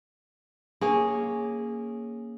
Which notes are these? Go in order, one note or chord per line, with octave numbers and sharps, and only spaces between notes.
A#3 C#4 G#4